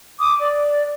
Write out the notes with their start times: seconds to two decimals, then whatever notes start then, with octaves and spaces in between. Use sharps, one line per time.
0.19 D6 D#6
0.39 D5